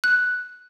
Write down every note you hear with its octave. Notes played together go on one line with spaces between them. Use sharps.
F#6